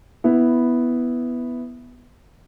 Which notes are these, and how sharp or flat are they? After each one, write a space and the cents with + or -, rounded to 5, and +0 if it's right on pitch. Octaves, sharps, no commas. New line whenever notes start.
B3 +0 E4 +0